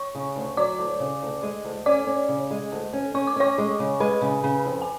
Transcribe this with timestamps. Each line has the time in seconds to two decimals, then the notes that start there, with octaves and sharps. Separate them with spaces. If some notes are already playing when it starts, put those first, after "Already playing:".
Already playing: C#5 C#6
0.15 C#3
0.36 D2
0.57 F#3 D5 D6
0.79 D2
1.00 C#3
1.22 D2
1.43 G#3
1.64 D2
1.86 C#4 D5 D6
2.07 C#4
2.29 C#3
2.51 G#3
2.72 D2
2.93 C#4
3.15 C#4 C#6
3.27 D6
3.36 C#4 C#5 C#6
3.58 G#3
3.79 C#3
4.00 G#3 B4 B5
4.22 C#3
4.43 C#3
4.66 F2
4.82 G#5